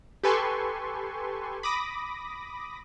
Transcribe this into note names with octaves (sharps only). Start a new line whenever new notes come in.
G4 A4 B4 G#5 C6 C#6
B5 D6 D#6 A#6